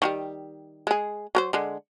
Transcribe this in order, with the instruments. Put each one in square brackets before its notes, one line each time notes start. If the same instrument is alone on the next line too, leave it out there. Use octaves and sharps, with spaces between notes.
[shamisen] D#3 F3 G3
G#3 G#4
F#3 A#4 C5
D3 G#3